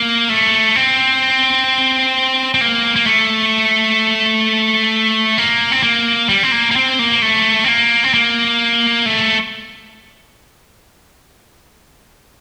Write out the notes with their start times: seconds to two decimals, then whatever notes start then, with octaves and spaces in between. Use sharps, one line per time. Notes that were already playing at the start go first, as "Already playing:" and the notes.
Already playing: A#3
0.29 A3
0.76 C4
2.54 C4
2.61 A#3
2.96 A#3
3.06 A3
5.38 A#3
5.72 C4
5.83 A#3
6.29 G3
6.43 C4
6.52 A#3
6.71 A#3
6.76 C4
6.99 A#3
7.22 A3
7.64 C4
7.68 A#3
8.04 C4
8.14 A#3
9.06 A3